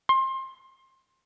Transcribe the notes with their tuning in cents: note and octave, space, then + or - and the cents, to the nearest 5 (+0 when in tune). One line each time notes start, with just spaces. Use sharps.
C6 +25